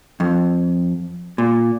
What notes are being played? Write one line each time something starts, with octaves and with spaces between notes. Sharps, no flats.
F2
A#2